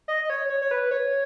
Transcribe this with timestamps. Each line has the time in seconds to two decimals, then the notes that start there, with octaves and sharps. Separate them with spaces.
0.08 D#5
0.25 D#5
0.30 C#5
0.50 C#5
0.61 C#5
0.71 B4
0.91 C#5